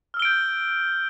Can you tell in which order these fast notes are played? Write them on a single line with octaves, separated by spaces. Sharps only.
F6 E6 G7 D7 G6